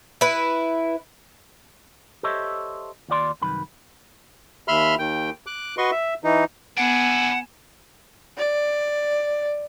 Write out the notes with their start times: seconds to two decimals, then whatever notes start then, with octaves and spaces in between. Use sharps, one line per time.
0.21 E4 B4
2.23 G4 A4 C5 C#5 D#5 E5
3.08 D#2 F4 D5 C6
3.41 C2 F#2 D#3 B4 B5
4.68 D#2 E5 B5 C6 F6
4.99 D#2 D#3 G5
5.46 D6 F#6
5.78 F#4 B4 D#5 C6 C#6
5.91 E5
6.24 E3 D#4
6.77 B3 D4 E4 F#5 G#5
8.38 D5